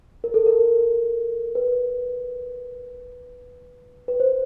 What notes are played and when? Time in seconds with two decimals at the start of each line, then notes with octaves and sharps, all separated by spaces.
0.24 A#4
0.34 A4
0.46 A#4
1.55 B4
4.08 B4
4.20 C5